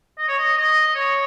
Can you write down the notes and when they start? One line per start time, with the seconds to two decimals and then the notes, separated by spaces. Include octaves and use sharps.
0.18 D#5
0.28 C#5
0.38 D#5
0.58 D#5
0.95 C#5